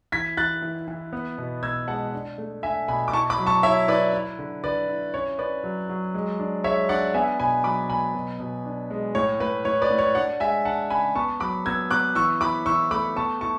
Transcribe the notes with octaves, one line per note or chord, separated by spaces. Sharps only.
E3 G#6 B6
E3 F#6 A6
E3
E3
B3
B2
B2 E6 G#6
G#3 F#5 A5
D4
A3
D4 E5 G#5
B2 G#5 B5
D6
E4 A5 C#6
B5 D6
F#3
A5 C#6
E4 C#5 E5
E4 B4 D5
E4
D3
D3 B4 D5
E4
C#4 C#5
C#4 B4 D5
F#3
F#3
G#3
D4
G#3 C#5 E5
D4 D5 F#5
B3 E5 G#5
B2 G#5 B5
F#3 B5 D6
B3 G#5 B5
B2
B2
D4
G#3
A2 C#5
A2 B4
A2 C#5
B4 D5
A2
C#5
D4 D5 F#5
G#3 E5 G#5
D4 F#5 A5
C#3 G#5 B5
B3 A5 C#6
F#3 B5 D6
B3 E6 G#6
B3 D6 F#6
E3 C#6 E6
E3 B5 D6
E3 C#6 E6
A3 B5 D6
B3 A5 C#6
E4 A5 C#6